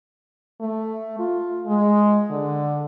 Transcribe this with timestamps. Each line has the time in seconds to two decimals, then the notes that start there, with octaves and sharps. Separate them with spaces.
0.61 A3
1.19 F4
1.66 G#3
2.30 D3